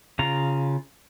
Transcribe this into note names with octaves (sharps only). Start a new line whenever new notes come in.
C#3 F4 A#5